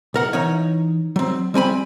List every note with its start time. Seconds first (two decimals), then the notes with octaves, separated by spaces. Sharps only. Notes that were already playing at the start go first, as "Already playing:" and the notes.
0.14 B1 A#4 F#5
0.33 E3 D#4 C#5
1.16 F#3 C4
1.54 G3 C4 G#5 B5